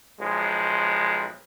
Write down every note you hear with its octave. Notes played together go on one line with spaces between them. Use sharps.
B1 F3 G#3